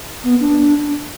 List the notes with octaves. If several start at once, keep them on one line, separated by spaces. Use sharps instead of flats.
B3
D4